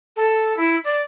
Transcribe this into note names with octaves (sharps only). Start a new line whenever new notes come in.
A4
E4
D5